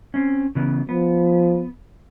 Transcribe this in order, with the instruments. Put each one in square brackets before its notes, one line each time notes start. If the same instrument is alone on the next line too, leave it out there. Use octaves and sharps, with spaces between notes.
[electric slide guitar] C4 C#4
C#3 E3 B3
[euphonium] F3 [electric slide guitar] B3